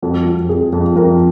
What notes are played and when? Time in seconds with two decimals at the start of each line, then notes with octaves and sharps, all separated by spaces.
0.02 F2 F#4
0.26 F2
0.49 F2 G#4
0.73 F2
0.96 F2 A#4